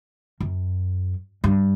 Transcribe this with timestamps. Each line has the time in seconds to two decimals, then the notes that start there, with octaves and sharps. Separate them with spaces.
0.40 F#2
1.44 G2